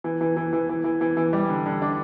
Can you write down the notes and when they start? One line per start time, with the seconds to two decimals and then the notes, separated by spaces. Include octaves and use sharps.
0.04 E3
0.21 E3
0.37 E3
0.53 E3
0.69 E3
0.84 E3
1.01 E3
1.17 E3
1.33 G3
1.50 D3
1.66 D3
1.82 D4